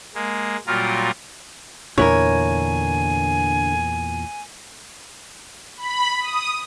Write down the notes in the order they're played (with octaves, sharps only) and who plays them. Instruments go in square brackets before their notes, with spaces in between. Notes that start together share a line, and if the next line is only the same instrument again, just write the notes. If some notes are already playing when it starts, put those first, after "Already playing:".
[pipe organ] G#3 A#3
A#2 F#3 G3 F4 A#4
[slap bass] E2 A#2 [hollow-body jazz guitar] D3 E4 A#4 [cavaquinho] C#5 [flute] G#5
[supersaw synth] B5
D#6